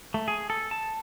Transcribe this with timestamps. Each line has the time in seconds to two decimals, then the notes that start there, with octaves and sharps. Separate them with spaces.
0.14 A3
0.28 G#4
0.50 A4
0.71 A5